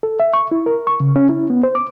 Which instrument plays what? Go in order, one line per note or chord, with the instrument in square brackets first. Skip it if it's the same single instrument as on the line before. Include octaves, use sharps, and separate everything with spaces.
[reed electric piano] A4
E5
C#6
E4
A#4
C#6
C#3
C#4
E4
B3
C5
D6